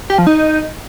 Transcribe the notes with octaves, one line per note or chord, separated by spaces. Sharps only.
G4
F3
D#4